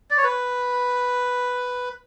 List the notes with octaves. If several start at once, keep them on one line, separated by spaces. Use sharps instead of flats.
D5
C#5
B4